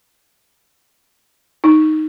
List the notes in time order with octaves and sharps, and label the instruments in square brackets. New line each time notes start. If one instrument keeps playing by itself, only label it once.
[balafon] D#4